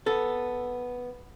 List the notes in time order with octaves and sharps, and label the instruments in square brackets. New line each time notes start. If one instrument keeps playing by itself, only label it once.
[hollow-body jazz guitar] B3 A4